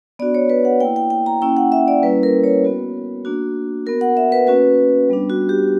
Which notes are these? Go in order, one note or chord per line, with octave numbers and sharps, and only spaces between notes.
B3 D4 F#4 D5
C#5
B4
F#5
A#3 E4 G5
G5
G5
A#5
A#3 C#4 E4 G5
F#5
E5
D5
G3 A#3 C#4 E4 B4
A#4
C#5
B3 F#4
A#3 D4 F#4
B3 F#4 A#4
F#5
E5
B4
A#3 C#4 F#4 B4
G3 B3 D4
F#4
G4